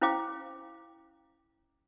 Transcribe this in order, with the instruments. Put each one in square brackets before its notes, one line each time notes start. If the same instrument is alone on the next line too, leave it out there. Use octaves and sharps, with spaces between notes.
[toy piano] C#4 E4 C5 F5 G5 D6